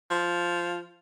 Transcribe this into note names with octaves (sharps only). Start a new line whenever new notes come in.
F3